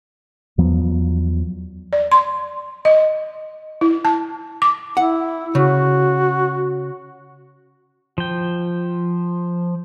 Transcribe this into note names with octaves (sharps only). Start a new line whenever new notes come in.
E2 F3 F#3 B3
D5
C6
D#5
E4
A5
D6
E4 F#5
C#3 F#4
F3 G5